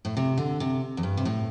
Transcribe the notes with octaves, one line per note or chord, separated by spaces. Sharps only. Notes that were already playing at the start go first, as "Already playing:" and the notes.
A2
C3
D3
C3
E2
G2
C3
A2